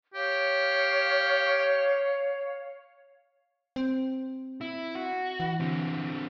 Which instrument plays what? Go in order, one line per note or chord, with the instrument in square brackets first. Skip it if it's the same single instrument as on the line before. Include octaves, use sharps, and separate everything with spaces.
[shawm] G4 [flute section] C#5 F5
[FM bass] C4
[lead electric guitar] E4
F#4
[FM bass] E3
[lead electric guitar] D3 C4